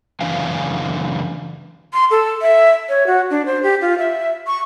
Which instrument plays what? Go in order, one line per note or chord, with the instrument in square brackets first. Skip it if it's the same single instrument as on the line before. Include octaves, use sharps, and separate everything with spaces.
[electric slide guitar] F#2 C#3 E3 D4 F5 G#5
[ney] C6
A4
E5
C#5
F#4
D4
C5
G4
F4
E5
C#6